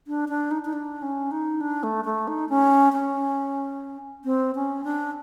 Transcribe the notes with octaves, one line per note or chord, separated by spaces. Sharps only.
D4
D4
D#4
D#4
D4
C#4
D#4
D4
A3
A3
D#4
C#4
C#4
C4
C#4
D4